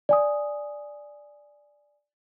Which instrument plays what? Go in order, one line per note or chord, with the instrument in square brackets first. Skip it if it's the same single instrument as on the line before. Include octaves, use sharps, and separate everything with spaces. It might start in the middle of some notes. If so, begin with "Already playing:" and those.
[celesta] D5 G#5 D#6